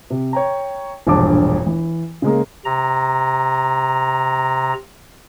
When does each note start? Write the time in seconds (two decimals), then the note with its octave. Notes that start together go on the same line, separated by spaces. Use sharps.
0.10 C3
0.33 C#5 G5 A#5
1.07 E1 A#1 G2 A5 D6
1.66 E3
2.22 C#3 G#3 A#3
2.65 C3 A#5